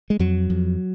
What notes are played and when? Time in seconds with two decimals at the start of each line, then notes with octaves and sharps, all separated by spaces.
0.10 G#3
0.19 F2 F#3
0.50 F2